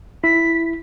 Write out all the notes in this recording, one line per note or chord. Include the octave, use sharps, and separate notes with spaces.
E4 B6